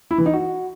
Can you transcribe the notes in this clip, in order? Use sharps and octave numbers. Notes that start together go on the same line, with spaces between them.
E4
E3
D#4
F#4